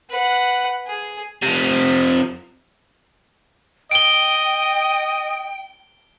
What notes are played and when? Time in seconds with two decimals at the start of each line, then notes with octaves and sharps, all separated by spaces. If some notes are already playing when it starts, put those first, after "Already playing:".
0.10 B4 F#5
0.87 G#4
1.43 C3 F3
3.91 D#5 G5 D7 G7